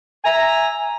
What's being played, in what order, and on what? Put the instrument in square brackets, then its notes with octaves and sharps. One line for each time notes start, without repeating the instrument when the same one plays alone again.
[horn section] E5 G#5 A#5